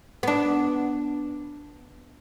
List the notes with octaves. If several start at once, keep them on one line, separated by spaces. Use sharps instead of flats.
B3 D4